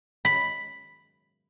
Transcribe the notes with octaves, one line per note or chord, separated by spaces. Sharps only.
B5